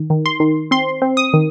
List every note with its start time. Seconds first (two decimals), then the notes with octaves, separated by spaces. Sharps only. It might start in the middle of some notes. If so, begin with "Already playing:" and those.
Already playing: D#3
0.10 D#3
0.26 C6
0.40 D#3
0.71 C4 C6
1.02 C4
1.17 D#6
1.34 D#3